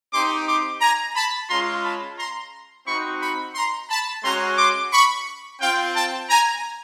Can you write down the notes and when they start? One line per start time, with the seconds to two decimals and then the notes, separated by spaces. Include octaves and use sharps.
0.13 C4 D#4 G4 C6 D6
0.47 C6 D6
0.81 G#5 A#5
1.16 A5 B5
1.50 G#3 C#4 F4 A#5 C6
1.84 A5 B5
2.18 A#5 C6
2.87 C4 D#4 F#4 B5 C#6
3.22 B5 C#6
3.55 A#5 C6
3.90 A5 B5
4.24 G#3 C#4 F#4 A#5 C6
4.58 C6 D6
4.93 B5 C#6
5.61 C4 F4 F5 G5
5.96 G5 A5
6.30 G#5 A#5